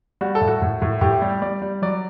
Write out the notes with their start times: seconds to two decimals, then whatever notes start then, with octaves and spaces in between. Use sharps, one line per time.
0.21 G3 F#4
0.35 A4
0.41 A2
0.48 F#4
0.62 A2
0.82 A2
1.01 A2 G4
1.22 G3
1.42 G3 D5
1.62 G3
1.82 F#3 D5